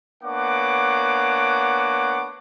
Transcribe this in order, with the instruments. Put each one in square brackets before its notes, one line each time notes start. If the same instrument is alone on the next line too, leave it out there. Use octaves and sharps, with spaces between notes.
[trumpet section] A#3 B3 D4 C#5 F#5 D6